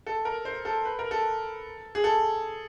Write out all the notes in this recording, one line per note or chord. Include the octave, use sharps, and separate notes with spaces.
A4
A#4
C5
A4
B4
A#4
A4
G#4
A4